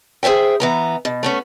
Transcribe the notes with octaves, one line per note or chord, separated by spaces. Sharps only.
G#4 C5 C#5 E5 G5
E3 B3 A#5
B2
A3 B3 C#4